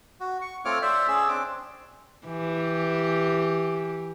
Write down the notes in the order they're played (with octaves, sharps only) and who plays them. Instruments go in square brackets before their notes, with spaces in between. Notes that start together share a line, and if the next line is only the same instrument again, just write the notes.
[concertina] F#4
C#6
A3 C4 F4 C#5 D6 F6
C5 D5 E5
C#4 G#4 E6
C4 D4 D6
[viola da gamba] E3 G4